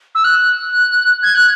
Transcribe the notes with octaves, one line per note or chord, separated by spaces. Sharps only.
E6
F#6
G#6
F#6